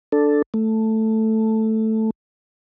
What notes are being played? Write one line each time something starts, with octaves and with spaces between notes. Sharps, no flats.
D4 A4
A3